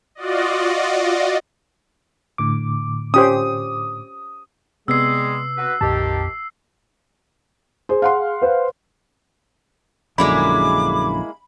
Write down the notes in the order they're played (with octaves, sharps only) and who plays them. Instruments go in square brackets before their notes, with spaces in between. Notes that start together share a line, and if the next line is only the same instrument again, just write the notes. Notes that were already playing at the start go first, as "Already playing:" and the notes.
[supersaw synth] F4 F#4 D5 D#5
[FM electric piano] A2 D3 D6
[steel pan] C#4 G4 C5 [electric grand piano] D#6
[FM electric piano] C3 B3 [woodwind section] G3 G#3 G#4 [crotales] E6 C7
[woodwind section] F#4 B4
[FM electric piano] A#1 A5 [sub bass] F2 [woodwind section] D#3 G4
[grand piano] G#4 [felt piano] C5
[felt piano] F5 F#5 C6
[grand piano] B4 C5
[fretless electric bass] A#1 F#2 D3 [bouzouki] G#3 A#3 E4 [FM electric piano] B5 [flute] D6